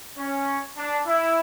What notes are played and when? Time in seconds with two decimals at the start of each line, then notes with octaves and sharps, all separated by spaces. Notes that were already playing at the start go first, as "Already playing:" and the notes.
0.18 C#4
0.77 D4
1.06 E4